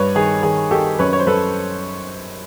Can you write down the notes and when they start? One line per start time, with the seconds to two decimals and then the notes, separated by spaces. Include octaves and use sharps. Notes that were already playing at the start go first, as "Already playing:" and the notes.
Already playing: G2 B4 C#5
0.15 D#3 G#4
0.43 D#3 G#4
0.71 D#3 G4 A4
0.99 F#2 B4 C#5
1.13 C#5
1.20 C5
1.26 F#2 A4 B4